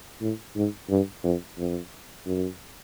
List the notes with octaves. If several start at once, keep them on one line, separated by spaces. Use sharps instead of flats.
A2
G#2
G2
F2
F2
F#2